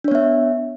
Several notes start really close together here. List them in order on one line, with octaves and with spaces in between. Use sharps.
D4 C#5 B3 E5